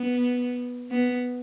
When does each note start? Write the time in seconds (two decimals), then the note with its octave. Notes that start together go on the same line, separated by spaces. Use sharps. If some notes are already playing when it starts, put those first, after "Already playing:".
Already playing: B3
0.91 B3